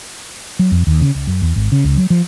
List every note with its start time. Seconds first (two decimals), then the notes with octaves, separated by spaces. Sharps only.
0.59 F#3
0.72 F2
0.87 D#2
1.01 C#3
1.15 C#2
1.27 F#2
1.42 E2
1.56 G#1
1.72 C#3
1.85 C#2
1.97 F#3
2.10 F3